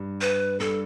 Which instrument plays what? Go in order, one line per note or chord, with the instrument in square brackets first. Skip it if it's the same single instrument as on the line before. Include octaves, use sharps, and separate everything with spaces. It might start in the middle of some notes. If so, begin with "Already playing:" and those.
Already playing: [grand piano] G2
[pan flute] B4
[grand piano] G2 [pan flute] A4